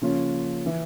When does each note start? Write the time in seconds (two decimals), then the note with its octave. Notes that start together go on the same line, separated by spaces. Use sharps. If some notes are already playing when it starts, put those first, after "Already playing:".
0.02 C#3 F3 A#3 C#4 F4
0.66 E3